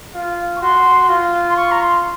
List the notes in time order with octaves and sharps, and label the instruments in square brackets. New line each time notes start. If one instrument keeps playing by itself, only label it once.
[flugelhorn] F4
[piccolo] C#6
[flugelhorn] F#4 [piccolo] C6
[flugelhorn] F4
[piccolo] C6
C#6
A#5
C6